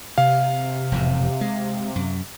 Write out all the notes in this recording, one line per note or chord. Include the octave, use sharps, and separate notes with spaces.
C3 F5
E1 F2 A2
G#3
F#2